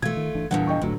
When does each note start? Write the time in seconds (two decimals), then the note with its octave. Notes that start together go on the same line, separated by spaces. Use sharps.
0.02 B2 E3 A3 F4 G#6
0.17 D#3
0.34 G1 E3 D4
0.51 E2 A#2 D3 E3 G3 F#5
0.67 D#5 G5 C#6
0.82 F#1 D2 A2 D3 F#3 A3